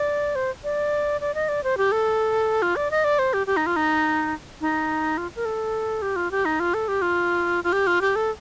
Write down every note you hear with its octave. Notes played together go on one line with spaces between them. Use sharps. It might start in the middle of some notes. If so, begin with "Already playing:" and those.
Already playing: D5
C5
D5
D5
D#5
D5
C5
G4
A4
F4
D5
D#5
D5
C5
G4
G4
D#4
F4
D#4
D#4
F4
A#4
A4
G4
F4
G4
D#4
F4
A4
G4
F4
F4
G4
F4
G4
A4